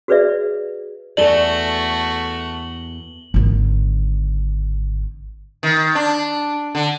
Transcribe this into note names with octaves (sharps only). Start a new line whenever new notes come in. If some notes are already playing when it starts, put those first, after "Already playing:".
F#4 G#4 B4 C#5 D5 E5
E2 A3 F#4 A4 D5 F#7 G7
G#1 D3
D#3
D4
D3